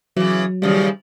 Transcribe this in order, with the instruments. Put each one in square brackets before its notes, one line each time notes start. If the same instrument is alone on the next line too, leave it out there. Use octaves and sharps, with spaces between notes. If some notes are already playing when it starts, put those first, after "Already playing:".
[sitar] C#3 E3 [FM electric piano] F#3
[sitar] D#2 C#3 F3 [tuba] G3